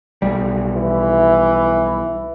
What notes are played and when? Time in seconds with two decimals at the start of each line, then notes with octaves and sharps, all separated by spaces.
0.22 B1 G3
0.74 E3